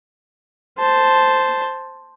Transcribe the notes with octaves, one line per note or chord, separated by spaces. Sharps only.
C5 A5